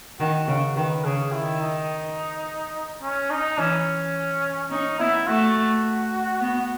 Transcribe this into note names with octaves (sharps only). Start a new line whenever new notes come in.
D#3 F#4
C#3 F#4
D#3 B4
C#3 G#4
D#3 E4
D#4
C#4
D#4
E3 C#4
C#4 D#4
B3 E4
A3 F#4
B3